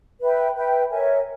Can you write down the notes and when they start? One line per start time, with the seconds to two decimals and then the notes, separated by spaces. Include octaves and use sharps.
0.21 B4 E5 G5
0.55 B4 E5 G5
0.90 A#4 C#5 E5 G#5